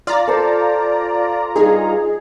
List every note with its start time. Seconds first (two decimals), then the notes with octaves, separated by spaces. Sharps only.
0.07 F4 D5 A#5
0.27 A4 C5
1.56 G2 D#4 G#4